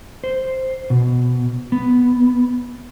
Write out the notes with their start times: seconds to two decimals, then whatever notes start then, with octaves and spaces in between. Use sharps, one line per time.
0.24 C5
0.90 B2
1.72 B3